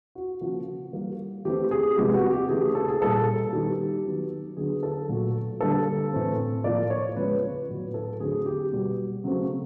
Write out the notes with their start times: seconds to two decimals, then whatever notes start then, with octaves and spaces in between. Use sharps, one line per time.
0.15 F#4
0.41 C#3 F3 A#3 F#4
0.93 E3 G3 A#3
1.45 E3 A3 C4 G4
1.71 G#4
1.97 C3 F3 G#3 B3 G4
2.14 F#4
2.32 G4
2.49 C#3 E3 A3 G#4
2.75 A4
2.88 G#4
3.01 A#2 G3 A#3 A4
3.53 D#3 G3 B3 G4
4.04 D#3 F#3 B3
4.57 D3 F#3 B3 G#4
4.83 A4
5.09 A#2 F#3 A3
5.60 D3 G3 A#3 A4
6.13 A2 E3 A3 C4
6.64 A2 F3 A#3 D5
6.90 C#5
7.16 C#3 F3 G#3 B3 B4
7.42 B4
7.68 A2 F#3 B3
7.94 A4
8.20 D3 F#3 A3 C4 G#4
8.46 G4
8.72 B2 G3 B3 F#4
9.24 C#3 F#3 A3 C4